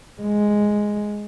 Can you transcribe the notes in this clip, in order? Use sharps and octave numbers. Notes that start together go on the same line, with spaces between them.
G#3